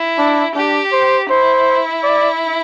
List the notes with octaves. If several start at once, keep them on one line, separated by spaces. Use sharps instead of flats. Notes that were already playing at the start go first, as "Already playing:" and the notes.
Already playing: E4
D4
D4 G4
C5
E4 C5
D5